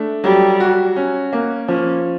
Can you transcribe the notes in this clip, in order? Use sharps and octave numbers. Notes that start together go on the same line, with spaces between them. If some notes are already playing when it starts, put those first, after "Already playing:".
Already playing: A3 D4
F#3 G3
F#4
C#4
A#3
F3 C#4